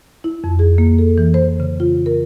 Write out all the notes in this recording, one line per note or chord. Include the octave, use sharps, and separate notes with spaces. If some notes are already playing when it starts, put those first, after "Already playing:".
E4
F2
G#4
A#3
A4
E3
C5
C#3
F4
A#4